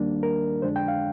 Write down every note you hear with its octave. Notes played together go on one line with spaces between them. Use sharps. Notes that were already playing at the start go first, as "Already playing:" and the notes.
Already playing: D#2 D#3 G3 A#3 D4
A#4
F2 D3 G#3 D4 C5
G5
F5